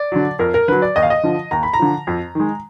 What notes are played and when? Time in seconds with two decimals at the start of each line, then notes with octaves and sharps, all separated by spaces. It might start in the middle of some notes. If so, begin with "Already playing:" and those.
Already playing: D5
0.12 D3 F#3
0.39 F2 A#4
0.54 A#4
0.68 D3 F#3 B4
0.82 D5
0.96 D#2 D#5
1.03 F5
1.10 D#5
1.23 D3 F3
1.51 D#2 A#5
1.63 B5
1.73 A#5
1.79 D3 F3
2.07 F2
2.35 D#3 G#3